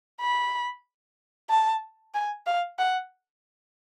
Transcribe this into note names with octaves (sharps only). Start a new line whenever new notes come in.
B5
A5
G#5
F5
F#5